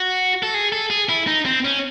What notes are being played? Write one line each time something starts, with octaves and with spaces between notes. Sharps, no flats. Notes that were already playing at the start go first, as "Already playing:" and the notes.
Already playing: F#4
A4
G#4
A4
G#4
E4
D#4
C4
C#4